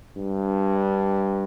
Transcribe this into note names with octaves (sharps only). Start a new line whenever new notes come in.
G2